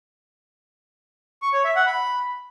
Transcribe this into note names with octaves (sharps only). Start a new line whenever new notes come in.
C#6
C#5
E5
F#5
B5